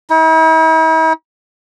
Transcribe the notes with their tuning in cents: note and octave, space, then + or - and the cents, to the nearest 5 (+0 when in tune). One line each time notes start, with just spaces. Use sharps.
E4 -45